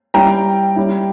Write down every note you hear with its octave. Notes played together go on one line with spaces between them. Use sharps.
G3 C#4 E4 G5 A#5
G3 C#4 E4